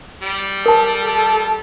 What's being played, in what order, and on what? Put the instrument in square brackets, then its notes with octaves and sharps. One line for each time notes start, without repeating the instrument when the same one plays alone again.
[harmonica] G3
[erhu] A4 [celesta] A#4 A5
[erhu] A4